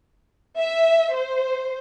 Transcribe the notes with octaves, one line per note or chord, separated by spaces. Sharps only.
E5
C5